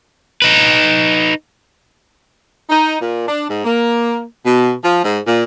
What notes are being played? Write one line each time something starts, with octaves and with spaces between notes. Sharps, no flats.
D#4 B4
D#4
A#2
D4
G#2
A#3
B2
F3
G#2
A#2